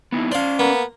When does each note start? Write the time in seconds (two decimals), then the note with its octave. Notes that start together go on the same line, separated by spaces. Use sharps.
0.12 B3 D#4 E4
0.32 C#4 C5 D5 F5
0.59 A#3 B3